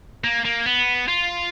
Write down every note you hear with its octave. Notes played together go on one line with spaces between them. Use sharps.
A#3
A#3
B3
F4